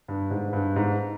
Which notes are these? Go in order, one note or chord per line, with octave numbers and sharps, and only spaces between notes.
G2
G#2
G2
G#2